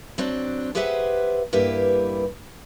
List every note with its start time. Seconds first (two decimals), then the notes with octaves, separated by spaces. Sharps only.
0.18 F#3 C4 D4
0.75 G4 G#4 B4 C5 E5 F#5
1.53 G2 A#3 E4 G4 B4